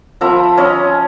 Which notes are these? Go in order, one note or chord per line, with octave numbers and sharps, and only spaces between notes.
F3 E5 A#5 B5
C#4 D#5 A#5